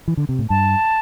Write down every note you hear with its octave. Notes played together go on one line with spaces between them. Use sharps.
E3
D3
C3
A2
G2 A5